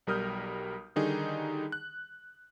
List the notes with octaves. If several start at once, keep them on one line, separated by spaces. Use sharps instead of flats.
B1 G3 A#4 D#6 F6 G6
D3 D#3 G3 D#4 G#4
F#6